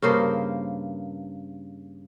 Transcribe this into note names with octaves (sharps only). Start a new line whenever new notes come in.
G2 C#3 A#3 C5